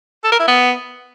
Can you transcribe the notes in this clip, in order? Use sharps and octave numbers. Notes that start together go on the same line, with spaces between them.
A4
A#4
E4
B3